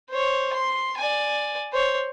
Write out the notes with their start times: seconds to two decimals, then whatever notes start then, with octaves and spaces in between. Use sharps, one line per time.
0.10 C5 C#5
0.53 C6
0.98 D5 G#5
1.73 C5 C#5